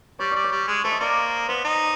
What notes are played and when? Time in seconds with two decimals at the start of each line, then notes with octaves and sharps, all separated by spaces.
0.19 G3 C#5
0.31 G3 D5
0.44 C#5
0.52 G3
0.68 G#3
0.84 A3 C5
0.92 D#5
1.00 A#3 D5
1.49 B3 C5
1.65 D#4